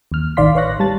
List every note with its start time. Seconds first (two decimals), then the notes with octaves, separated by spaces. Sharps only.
0.12 D#2 F6
0.37 A1 D#3 D5 F5 C6 B6
0.55 B4 C#5 F5 C#6 F#6 A#6
0.80 G3 A5 A6